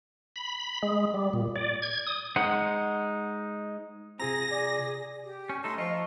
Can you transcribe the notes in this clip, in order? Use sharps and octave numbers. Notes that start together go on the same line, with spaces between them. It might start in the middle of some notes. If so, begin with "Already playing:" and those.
B5
G#3
G3
A#2
D5
G#6
D#6
G#3 D#4 C5 F#5
C3 C4 F4 G#4 A#5 A#6
G#4 D5
G4
C#4
A3 D#4 A4 C6
F3 F4 D#5 C#6